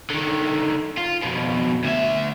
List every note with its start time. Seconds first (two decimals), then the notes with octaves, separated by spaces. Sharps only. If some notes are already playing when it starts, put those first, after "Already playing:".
0.10 D3 D#3
0.97 F4
1.23 F2 B2
1.84 D2 E5